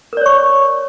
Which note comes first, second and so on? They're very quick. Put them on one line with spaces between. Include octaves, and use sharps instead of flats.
A#4 D5 C#5 C#6